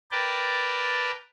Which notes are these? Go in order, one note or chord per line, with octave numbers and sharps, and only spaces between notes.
A#4 B4 D5 G5 A5